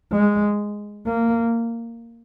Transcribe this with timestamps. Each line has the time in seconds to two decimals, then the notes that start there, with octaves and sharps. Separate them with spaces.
0.11 G#3
1.06 A#3